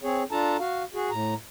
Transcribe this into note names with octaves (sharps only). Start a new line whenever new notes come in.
C4 G#4 C#5
D4 F4 A4 A5 A#5
F#4 F5
F#4 G#4
A2 A#5